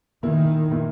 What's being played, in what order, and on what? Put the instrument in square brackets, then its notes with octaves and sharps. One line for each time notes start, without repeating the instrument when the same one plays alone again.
[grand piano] A#2 A#3 E4 [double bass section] D#3
[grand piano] A#2 A#3 E4